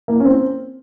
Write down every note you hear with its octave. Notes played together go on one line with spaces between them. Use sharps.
A#3
C#4
C4